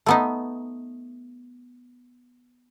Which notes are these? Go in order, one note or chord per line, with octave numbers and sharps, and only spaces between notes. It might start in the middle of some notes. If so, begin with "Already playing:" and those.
A3 B3 D#4